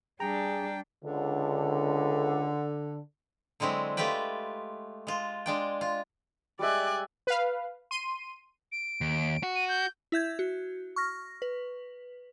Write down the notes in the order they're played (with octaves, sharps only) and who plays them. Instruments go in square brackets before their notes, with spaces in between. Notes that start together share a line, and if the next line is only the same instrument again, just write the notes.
[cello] G3 D4 [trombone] G#4 [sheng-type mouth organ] G5 [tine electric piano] A#5
[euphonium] C#2 [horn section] D3
[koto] D3 F#3 G#3 C4 E4
G#3 A3 F4 G4 B4 G5
G#3 F4
G#3 D4 G5
F4
[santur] G3 G#3 E5 [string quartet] D5 G#5 F#6
[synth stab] B4 F5
C6 D#7
[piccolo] D7
[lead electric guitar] D#2
F#4
[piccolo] D#7
G6
[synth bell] E4 E5 G6 G#6
F#4
C#6 F6 A#6
B4